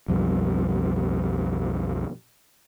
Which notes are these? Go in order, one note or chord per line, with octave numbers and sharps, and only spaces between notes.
B1 F2 G3